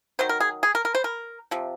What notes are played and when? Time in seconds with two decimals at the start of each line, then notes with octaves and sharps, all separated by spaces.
0.19 D#3 F#3 C5
0.29 A#4
0.40 G#4
0.63 G#4
0.75 A#4
0.85 A#4
0.95 C5
1.04 A#4
1.51 C3 F3